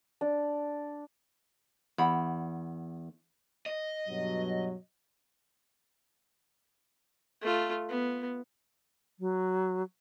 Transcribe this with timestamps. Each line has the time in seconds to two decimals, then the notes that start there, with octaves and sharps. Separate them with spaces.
0.21 D4
1.98 E2 F#5 B5
3.66 D#5
4.07 G2 B2 F#3
7.41 A3 F4
7.89 B3
9.19 F#3